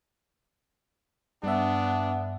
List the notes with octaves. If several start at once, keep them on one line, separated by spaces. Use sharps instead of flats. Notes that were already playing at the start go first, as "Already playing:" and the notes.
G2 B3 D4 E5